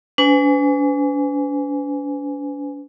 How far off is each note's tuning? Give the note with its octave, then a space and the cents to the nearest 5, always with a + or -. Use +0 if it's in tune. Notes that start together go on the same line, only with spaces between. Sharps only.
D4 -45 B4 +40 G#5 +0